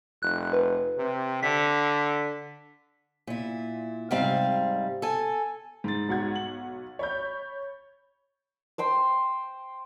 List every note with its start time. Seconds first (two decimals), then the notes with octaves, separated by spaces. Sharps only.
0.23 F1 F#6
0.53 B4
0.98 C3
1.43 D3 B6
3.27 A#2 E4
4.11 G#2 C3 G3 C4 F5
5.02 A4 G#5
5.84 G#2 A6
6.08 B1 F#5 G#6
6.35 F#7
6.99 C#5 B5 G6
8.78 C5 G5 C6